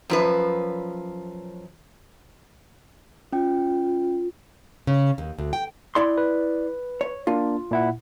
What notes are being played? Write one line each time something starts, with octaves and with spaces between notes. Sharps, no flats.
F#2 F3 B4
C#4 F4 G5
C#3
D#2
D2
G5
E4 D5 C6
B4
C#5
A#3 D4 F4
A#2 E4 F#5